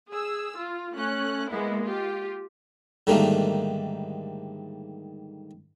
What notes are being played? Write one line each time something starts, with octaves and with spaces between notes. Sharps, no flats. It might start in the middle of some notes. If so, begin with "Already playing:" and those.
G#4 E6
F4
A3 C#4 F#6
G#3 A#3 B3 E4
F4 G4
G#2 D3 D#3 G3 A3 A#3